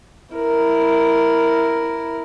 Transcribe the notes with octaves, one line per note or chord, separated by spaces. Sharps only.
E4 A#4